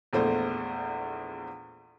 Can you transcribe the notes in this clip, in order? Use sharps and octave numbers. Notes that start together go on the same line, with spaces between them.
A#1 E2 A3 C5